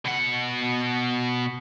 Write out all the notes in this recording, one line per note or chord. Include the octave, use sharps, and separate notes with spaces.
B2 F#5